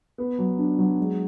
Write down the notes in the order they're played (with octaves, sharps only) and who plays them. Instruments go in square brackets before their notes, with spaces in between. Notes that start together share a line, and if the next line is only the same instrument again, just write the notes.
[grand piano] B3
F#3
D4
F#3
G#3